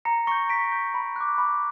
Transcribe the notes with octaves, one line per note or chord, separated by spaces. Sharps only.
A#5 A#6 C#7
C#6 G6 A#6 C#7
A#5 B6 D7
C#6 G6
B5
D6 F#6
B5